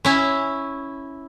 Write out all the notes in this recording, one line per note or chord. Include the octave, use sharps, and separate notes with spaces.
C#4 E4